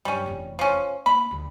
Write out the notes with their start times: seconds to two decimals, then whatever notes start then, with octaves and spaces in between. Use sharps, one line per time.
0.05 G2 F#3 G3 C#4
0.26 F1 E2
0.59 F3 C#4
1.06 A#3 B5
1.31 D2 F3